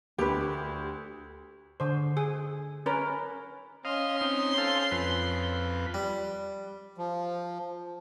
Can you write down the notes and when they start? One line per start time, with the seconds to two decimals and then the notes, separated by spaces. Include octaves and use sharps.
0.18 D2 G4 B4
1.80 D3 C5
2.17 G#4
2.86 C#4 A#4 B4
3.85 C#4 D#5 F5 C6
4.21 C4 D#4
4.58 A4 C5 F5
4.91 F2 B4
5.94 G3
6.98 F3